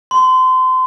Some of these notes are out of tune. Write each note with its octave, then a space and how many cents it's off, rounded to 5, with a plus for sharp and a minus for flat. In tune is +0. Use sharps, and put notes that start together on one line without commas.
C6 -30